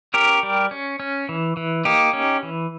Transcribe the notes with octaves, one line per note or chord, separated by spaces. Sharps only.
C#4 G4 A#4
G3
C#4
C#4
E3
E3
A#3 D#4 G4
C#4
E3